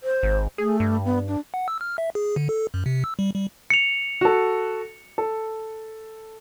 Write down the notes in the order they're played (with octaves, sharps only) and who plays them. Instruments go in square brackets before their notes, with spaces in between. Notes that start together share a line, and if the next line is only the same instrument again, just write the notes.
[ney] C5
[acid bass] G#1
[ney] A3 [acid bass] G#4
[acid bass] G2
[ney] B3
D4
[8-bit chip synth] F#5
E6
F6
E5
G#4
D3
A4
F#2
C3
E6
G3
G3
[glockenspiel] C#7 F7
[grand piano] F#4 A4
A4